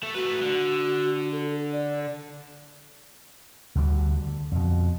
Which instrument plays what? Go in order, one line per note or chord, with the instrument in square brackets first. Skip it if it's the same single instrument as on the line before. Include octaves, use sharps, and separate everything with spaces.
[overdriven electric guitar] A3
[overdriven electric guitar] A3 B4 [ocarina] F#4
[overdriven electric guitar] D3
[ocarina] A4
D5
[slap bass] D2 D3 E3 G3
D3
F2 B2